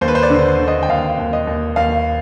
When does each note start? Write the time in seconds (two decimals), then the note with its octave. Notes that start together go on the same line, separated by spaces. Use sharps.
0.01 D#2 C5
0.08 B4
0.15 C5
0.23 D5
0.30 D3
0.60 D3
0.68 D#5
0.83 G5
0.88 D#2 F5
1.18 D#2
1.33 D#5
1.47 D#2
1.76 D#2 F5